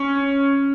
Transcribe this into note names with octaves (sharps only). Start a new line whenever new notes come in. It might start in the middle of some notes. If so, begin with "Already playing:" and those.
Already playing: C#4